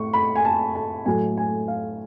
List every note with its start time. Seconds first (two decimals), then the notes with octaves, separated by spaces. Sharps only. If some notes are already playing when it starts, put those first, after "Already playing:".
Already playing: A2 C#6
0.14 B5
0.35 G#5
0.45 A5
0.75 A5
1.06 A2 F#3 A3 G#5
1.37 G#5
1.68 F5